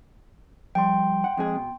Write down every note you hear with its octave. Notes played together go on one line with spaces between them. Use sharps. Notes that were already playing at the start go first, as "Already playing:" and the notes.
F3 G3 G5 C6
F#5
F2 G#3 G#4
B2